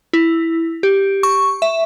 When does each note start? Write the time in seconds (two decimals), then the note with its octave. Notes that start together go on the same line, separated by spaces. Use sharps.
0.13 E4
0.83 G4
1.23 C#6
1.62 E5